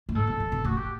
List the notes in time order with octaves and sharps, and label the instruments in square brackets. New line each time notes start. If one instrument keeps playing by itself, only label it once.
[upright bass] A2
[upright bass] G#2 [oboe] A4
[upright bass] B2
E3
B2
[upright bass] A2 [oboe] F#4
[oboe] G4